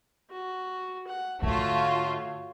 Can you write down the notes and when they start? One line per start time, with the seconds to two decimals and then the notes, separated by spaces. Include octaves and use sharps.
0.31 F#4
1.08 F#5
1.42 G#2 D3 A3 F4 F#4 C#5